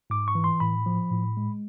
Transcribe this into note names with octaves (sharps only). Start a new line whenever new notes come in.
G#2 D6
C#6
E3
C6
A2 B5
F3
A2
G#3